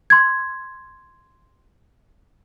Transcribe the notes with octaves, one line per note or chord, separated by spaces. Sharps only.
C6 G#6